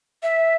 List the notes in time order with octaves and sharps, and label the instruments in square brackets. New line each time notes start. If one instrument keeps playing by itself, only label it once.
[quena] E5